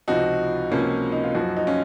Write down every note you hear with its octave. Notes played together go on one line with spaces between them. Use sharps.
C#2 C3 F3 D#4 F#4
C#2 C3 F3 A#3 C#4
D#4
F4
F#2 F3 D#4 F#4
D#4
C#4 F4